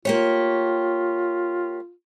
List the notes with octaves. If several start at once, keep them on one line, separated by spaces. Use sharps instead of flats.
A#3 F4 G4 C#5